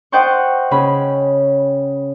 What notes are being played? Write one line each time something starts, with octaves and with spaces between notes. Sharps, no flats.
C5 D#5 F#5 G5 A5 C#6
C#3 C#4 B5